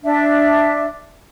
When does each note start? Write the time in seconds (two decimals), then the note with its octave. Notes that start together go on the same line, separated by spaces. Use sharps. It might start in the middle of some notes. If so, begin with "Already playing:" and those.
0.04 D4 E5